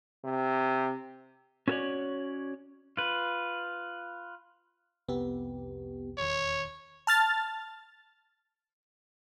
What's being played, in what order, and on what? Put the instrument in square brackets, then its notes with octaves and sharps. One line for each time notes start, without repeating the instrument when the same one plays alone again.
[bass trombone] C3
[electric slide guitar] C#4 F#4 A4 A#4 C#5 D5
[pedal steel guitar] F4 B4
[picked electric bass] C2 F2 C3 [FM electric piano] B3 G4
[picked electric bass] D#1 E2 D#3 [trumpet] C#5
[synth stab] A5 F6 A6